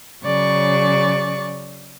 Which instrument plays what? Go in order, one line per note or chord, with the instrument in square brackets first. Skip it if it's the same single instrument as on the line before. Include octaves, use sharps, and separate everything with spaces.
[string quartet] C#3 F#3 D5 C#6 A6